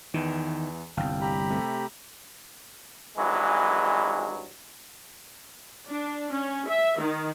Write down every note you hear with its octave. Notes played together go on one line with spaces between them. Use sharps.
E2 D#3 E3
G1 C2 F5 G5 A5
G4 A#5 B5
C3 A3
G#1 G2 E3 F#3 G#3
D4
C#4
E5
D#3